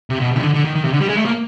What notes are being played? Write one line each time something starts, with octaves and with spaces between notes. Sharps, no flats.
C3
B2
C3
D#3
D3
D3
D#3
D#3
C3
D3
G3
G#3
A3
A#3